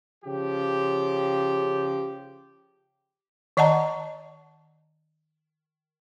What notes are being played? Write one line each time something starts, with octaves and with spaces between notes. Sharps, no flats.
C#3 F3 G4
D#3 D5 D#5 F#5 A5 A#5